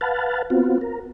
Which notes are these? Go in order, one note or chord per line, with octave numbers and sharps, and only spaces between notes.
B4 F5 F#5 A5
B3 C4 F4 F#4
A#4